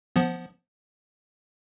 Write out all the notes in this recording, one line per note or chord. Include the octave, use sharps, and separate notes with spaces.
F3 B3